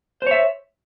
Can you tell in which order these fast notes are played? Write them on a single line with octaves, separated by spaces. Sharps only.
C5 C#5 E5